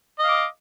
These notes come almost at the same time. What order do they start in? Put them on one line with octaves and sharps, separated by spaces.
D#5 F5 D6